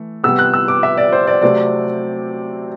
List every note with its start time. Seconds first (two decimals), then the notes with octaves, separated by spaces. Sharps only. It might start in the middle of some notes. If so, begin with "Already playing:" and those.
Already playing: E3 A3
0.23 C3 G3 B3 E6
0.39 F#6
0.54 E6
0.68 D6
0.83 E5
0.97 D5
1.12 C5
1.27 D5
1.42 C3 F#3 A3 C4 D5